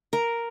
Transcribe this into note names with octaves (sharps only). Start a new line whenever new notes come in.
A#4